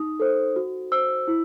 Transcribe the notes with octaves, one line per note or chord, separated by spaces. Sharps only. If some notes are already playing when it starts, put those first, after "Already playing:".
Already playing: D#4 D#6
A4 C5
F#4
C5 E6
E4